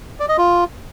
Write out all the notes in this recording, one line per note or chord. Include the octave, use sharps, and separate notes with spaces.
D5
D#5
F4